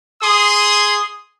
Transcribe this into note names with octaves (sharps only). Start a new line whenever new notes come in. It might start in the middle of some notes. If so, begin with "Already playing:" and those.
G#4 C6 D#6